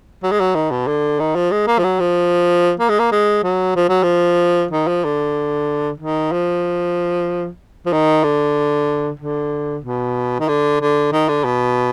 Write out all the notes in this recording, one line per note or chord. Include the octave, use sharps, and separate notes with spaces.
F#3
G#3
F#3
D#3
B2
D3
D#3
F3
G#3
A#3
F3
F#3
F3
A#3
G#3
A#3
G#3
F#3
F3
F#3
F3
D#3
F3
D3
D#3
F3
F3
D#3
D3
D3
B2
D#3
D3
D3
D#3
D3
B2